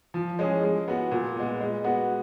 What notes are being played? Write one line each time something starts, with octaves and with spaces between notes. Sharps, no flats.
F3
G#3 C#4 G#4
G#3
B3 F#4
A#2
G#3 B3
G#3
B3 F#4